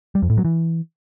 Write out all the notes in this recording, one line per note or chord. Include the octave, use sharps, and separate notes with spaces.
G3
F2
A2
F#3
E3